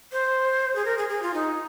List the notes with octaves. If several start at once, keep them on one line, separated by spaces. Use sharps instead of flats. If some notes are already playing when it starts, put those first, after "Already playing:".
C5
G#4
A#4
G#4
G#4
F4
D#4